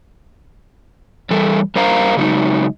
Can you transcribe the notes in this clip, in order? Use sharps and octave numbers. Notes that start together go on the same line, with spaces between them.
E3 G3 A4
G2 A#4 C5 F5 A#5
C#3 F#3 G#3 D#4